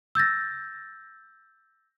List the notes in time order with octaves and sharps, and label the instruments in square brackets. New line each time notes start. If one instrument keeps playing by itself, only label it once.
[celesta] E6 G6 A6 A#6